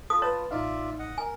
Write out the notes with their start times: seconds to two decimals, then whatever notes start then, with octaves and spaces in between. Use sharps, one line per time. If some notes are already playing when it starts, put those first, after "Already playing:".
0.10 F4 A4 D#6
0.22 B4 C#5 A5
0.51 A1 D#4 F4 D5 E5 F5
0.99 D#5 F#5
1.18 A#4 G#5